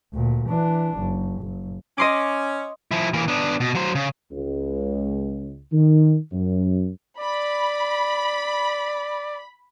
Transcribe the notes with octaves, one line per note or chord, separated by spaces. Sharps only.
D2 A#2
E3 D4
F#1
F#1
C#4 D#5 C6 D6
F3 E4
E3 A#3
B3 D4
B2
F#3 C5
C#3
C#2
D#3
F#2
D5 B5